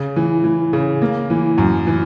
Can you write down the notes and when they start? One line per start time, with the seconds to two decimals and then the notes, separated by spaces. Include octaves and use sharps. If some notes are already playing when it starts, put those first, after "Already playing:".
Already playing: C#3
0.16 E3
0.44 E3
0.73 C#3
1.02 A#3
1.30 E3
1.58 F#2
1.87 E3